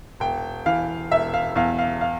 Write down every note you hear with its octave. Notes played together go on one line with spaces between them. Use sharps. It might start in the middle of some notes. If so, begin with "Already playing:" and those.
E1 G5
E3 F5
E1 E5
F5
E2 F5
F5
F5